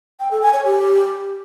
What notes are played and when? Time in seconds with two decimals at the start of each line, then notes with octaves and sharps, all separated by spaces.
0.20 G5
0.31 A4
0.42 G#5
0.53 C#5
0.64 G4